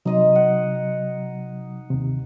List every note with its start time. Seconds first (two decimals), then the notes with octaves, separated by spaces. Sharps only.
0.05 C3 F#3 D#4 D#5 C6
0.36 F#5
1.90 D#2 C3